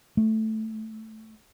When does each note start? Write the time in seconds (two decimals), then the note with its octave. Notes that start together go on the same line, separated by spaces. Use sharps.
0.17 A3